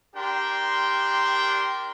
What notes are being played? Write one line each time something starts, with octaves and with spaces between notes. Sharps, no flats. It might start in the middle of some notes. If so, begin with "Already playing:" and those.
D4 G4 A#4 G5 C6